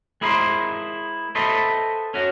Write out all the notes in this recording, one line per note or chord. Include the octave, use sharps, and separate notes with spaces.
G#3 E4 G#4 A#4 C5
A4 B4 C5 D#5 E5
C#4 F#4